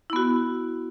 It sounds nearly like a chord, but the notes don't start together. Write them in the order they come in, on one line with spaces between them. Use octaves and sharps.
E4 B3 F#4